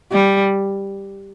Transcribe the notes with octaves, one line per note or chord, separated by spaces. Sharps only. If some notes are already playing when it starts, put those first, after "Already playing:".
G3